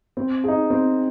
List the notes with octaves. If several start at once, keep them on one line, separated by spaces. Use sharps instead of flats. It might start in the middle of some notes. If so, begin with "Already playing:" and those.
C4
D#4 G#4
C4